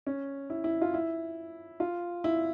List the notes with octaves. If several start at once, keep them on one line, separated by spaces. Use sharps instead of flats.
C#4
E4
E4
F4
E4
F4
E4